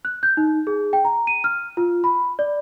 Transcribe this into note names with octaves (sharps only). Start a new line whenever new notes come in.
F#6
G6
D#4
G#4
G5
A#5
D#7
F6
F4
B5
D5